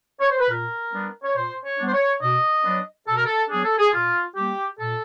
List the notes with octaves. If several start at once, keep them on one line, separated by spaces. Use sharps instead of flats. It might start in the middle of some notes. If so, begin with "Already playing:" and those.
C#5
C5
B4
A#2 A#4
G3 B3 D4
C#5
A#2 C5
C#5
G3 B3 D4
C5
C#5
B2 D#5
F#3 B3 D4
B2 A4
A#4
A4
F#3 B3 D4 G#4
A4
G#4
A#2 F4
G3 A#3 G4
A#2 A4